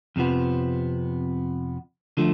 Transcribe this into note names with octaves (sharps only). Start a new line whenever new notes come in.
F2 C3 F3 B3
D3 F3 A3